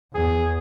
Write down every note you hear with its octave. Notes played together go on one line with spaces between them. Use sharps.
E2 G#4